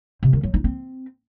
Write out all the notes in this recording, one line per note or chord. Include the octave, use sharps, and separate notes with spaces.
C3
D#3
F#3
D#4
C4